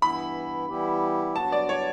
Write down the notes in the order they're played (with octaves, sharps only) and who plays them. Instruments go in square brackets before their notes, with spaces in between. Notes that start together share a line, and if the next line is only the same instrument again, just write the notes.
[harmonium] G2 E3 B3 E4 [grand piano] B5
[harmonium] E3 G3 B3 E4 G4
[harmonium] G2 F#3 B3 F#4 [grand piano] A5
[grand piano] D5
C#5